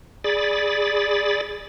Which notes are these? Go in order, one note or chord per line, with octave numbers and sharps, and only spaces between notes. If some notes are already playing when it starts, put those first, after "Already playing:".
G#4 D5 B5 A6